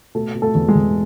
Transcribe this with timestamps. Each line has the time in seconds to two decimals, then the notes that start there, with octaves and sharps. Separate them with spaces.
0.15 B2 A3 A4
0.35 B2
0.42 A3 A4
0.55 E2
0.68 G#3 G#4
0.75 E2